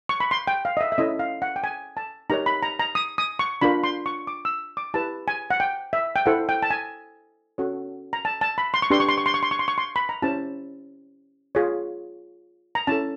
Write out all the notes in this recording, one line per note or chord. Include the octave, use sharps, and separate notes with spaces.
C#6
B5
C6
G5
F5
D#5
E5
E5
C#4 E4 A4 C#5 D#5
F5
F#5
G5
G#5
A5
D#4 G4 A#4 C#5 A#5
B5
A#5
A#5
D#6
D#6
C#6
D4 F4 A#4 B5
C6
C#6
D6
E6
D6
E4 G4 B4 A5
G#5
F#5
G5
E5
G5
E4 A4 C5 F#5
G5
A5
G#5
C#4 F#4 A4 C#5
A#5
A5
A5
B5
C6
C#6
D4 G4 B4 C6
C#6
C6
C#6
C6
C#6
C6
C#6
C6
C#6
C6
B5
A#5
C#4 E4 G4 C5 A5
F4 G#4 C#5
A#5
C#4 E4 A4 A5